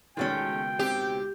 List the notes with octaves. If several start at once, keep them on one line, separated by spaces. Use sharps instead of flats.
C#2 B2 D#3 G#3 A3 C#4 G5
C4 G4